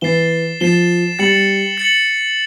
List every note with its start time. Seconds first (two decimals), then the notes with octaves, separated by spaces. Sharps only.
0.01 E3 A6 C7 E7 G7
0.60 F3 A6 C7 E7 G7
1.19 G3 A6 C#7 F#7
1.78 A6 C#7 F#7